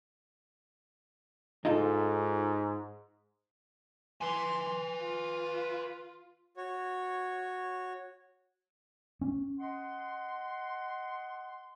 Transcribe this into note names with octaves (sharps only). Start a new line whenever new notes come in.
G#2 D#4 F4 A4
B4 G#5 C6
F4
F#4 C#5
C#4
D#5 F#5 C6